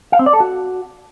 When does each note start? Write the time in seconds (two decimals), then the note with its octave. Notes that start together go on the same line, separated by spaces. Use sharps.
0.12 F5
0.19 C4
0.26 D5
0.33 A4
0.40 F#4